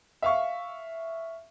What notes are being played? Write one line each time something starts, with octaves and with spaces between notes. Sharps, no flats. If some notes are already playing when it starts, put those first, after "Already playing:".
E5 F5 C#6